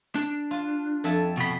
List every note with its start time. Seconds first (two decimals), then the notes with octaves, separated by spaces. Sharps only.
0.15 D4
0.51 F4
1.04 F2 E5 A5
1.37 B2 B5